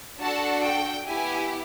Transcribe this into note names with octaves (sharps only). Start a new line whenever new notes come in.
D4 F#4 A4 A5
G5
B3 E4 G4 G#5